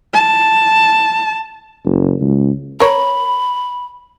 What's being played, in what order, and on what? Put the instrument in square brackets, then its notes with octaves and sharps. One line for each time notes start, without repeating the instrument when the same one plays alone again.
[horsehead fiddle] A5
[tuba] F#1
C#2
[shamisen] A#4 C#5 [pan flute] B5